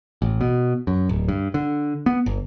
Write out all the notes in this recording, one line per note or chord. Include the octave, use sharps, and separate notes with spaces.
A1
B2
F#2
D1
G2
D3
B3
G1